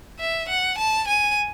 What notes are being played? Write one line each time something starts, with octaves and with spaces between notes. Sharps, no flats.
E5
F#5
A5
G#5